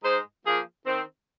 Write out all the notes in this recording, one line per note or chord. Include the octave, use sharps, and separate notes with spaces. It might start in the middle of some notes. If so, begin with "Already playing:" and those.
G#2 G#3 D#4 C5
F3 A#3 G#4
D#3 C4